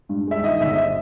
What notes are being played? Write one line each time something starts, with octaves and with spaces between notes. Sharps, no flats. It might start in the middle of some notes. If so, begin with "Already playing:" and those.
G2
G#3 E5
D#3 D#5
G1 E5
D#5
E5